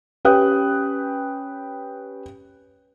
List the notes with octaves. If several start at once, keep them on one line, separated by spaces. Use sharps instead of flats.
C#4 G4 B4 G5 D#6 F#6